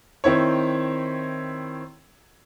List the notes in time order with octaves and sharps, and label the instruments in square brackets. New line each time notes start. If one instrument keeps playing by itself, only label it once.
[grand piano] D#3 C4 E4 C#5